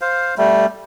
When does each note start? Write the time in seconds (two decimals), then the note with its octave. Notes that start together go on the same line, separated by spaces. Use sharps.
0.01 C5 F5
0.38 G3 A3